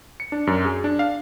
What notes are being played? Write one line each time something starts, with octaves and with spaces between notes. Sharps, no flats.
C#7
D4
F#2
G#4
D4
F5